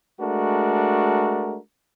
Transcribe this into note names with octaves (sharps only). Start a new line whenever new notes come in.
G#3 A3 D4 F#4 A#4